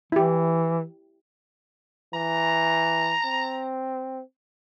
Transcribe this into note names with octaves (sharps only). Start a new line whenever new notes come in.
E3 E4 G4
E3 A#5
C4